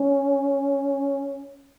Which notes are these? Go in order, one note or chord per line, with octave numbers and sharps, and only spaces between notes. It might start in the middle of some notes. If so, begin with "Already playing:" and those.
Already playing: C#4